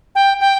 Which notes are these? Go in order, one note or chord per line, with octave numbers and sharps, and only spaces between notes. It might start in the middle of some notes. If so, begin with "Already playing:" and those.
G5
G5